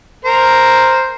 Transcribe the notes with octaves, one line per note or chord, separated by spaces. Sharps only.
A#4 C5